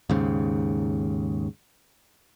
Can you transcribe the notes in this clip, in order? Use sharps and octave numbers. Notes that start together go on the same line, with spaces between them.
D#2 G#2 C#3